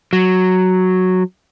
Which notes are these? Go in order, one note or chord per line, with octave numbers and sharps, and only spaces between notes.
F#3